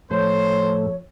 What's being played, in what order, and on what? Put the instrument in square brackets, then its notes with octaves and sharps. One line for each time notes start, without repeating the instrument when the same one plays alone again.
[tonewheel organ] A2 A3 [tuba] F3 [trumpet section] C5 [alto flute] C#5